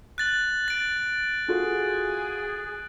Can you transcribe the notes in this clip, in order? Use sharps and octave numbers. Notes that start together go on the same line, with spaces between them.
F#6 A6 F#7
A6 D7
F4 F#4 G#4 A4